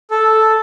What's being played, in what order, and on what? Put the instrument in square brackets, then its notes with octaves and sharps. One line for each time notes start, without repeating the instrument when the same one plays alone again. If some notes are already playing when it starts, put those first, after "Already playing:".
[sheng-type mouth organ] A4